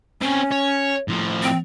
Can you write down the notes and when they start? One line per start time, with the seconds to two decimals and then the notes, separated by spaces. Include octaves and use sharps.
0.22 C4 C#4 C#5
0.51 C#5
1.08 A2 F3
1.42 C4